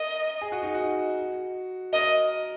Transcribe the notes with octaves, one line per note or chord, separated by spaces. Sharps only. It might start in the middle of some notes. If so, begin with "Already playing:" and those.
Already playing: A#4 D#5
G#4
F#4
D#4
F#4
A#4 D#5